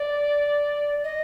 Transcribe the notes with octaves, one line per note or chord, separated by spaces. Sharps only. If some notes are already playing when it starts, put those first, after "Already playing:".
Already playing: D5
D#5